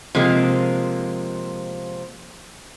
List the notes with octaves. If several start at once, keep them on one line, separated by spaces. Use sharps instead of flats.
C3 F3 G#3 A#3